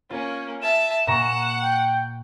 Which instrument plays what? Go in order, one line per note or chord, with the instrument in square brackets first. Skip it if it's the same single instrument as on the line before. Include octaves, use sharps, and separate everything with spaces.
[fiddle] A#3 C#4 [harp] F4
[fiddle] E5 A5 [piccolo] E7
[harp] A#2 A#5 C#6 [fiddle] F#5
[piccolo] G5